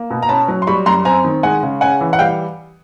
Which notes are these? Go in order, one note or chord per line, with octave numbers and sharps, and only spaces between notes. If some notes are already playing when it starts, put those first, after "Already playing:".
Already playing: A#3
B2
A#5
C#4 A5 B5
F#3
C6
G3 B5 C#6
F#2 A#5 C6
C4 G#5 A#5
D#3
G#3 F#5 G#5
C#3
C#4 F#5 G#5
E3
F#5
G3 F5 G5